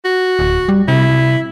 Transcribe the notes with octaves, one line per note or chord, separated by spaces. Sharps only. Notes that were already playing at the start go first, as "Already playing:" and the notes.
F#4
D1
G3
C3 E4